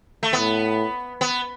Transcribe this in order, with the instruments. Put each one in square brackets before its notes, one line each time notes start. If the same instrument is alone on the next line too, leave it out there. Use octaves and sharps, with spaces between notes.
[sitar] A3
[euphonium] A2 [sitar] B3
[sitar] B3